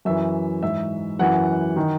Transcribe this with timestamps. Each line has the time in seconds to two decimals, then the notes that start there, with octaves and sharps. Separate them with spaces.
0.05 F#2 E3 E5
0.62 G#2 E3 E5
1.19 F#2 E3 F#5
1.76 D#3